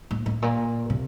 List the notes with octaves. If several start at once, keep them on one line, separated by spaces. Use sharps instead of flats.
A2
A2
A#2
C3